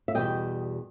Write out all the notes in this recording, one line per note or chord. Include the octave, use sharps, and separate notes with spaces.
E5
E2 B2 G3 D#5 G5